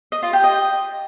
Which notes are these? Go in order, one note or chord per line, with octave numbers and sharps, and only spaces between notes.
D#5
F4
G4
D#5